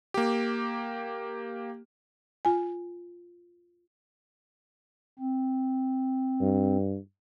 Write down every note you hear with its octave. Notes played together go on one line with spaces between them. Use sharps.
A#3 G4
F4 G#5
C4
G2